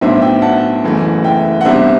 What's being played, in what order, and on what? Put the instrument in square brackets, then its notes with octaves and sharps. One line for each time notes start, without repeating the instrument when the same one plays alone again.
[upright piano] B1 A2 F#3 B3 D4 C5 E5
E5 G5
F#5 A5
F#1 F#2 E3 A3
E5 G5
F#5
C2 C3 G3 B3 D4 C5 E5